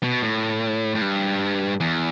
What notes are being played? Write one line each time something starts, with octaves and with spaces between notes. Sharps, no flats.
B2
A2
A2
G2
E2